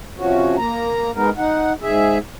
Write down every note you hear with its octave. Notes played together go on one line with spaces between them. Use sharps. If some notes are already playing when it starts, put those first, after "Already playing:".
C3 F3 C#4 F#4
A#3 A#5
G#3 B3 D#4 A#4
D#4 F#5
G#2 G#4 E5